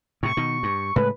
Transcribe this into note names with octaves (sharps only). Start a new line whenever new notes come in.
A2 C3 C#6
B2 D#3
G2
A2 C#3 G#3 B4